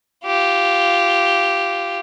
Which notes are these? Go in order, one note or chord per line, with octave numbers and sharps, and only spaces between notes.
F4 G4